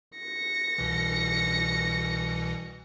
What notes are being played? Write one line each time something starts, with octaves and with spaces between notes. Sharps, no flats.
A#6 C#7
C2 B2 E3